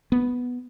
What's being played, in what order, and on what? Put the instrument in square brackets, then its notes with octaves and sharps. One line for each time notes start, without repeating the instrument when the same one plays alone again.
[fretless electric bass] B3